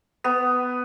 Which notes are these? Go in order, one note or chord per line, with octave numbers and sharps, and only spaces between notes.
B3